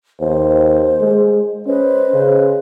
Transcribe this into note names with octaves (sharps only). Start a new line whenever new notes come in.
D#2 C5
G#3
C#4 B4 C5 D#5
C#3